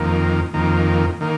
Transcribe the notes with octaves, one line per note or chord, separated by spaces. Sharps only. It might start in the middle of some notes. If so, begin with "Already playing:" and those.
Already playing: F2 D#3 A#3
F2 D#3 A#3
D#3 A#3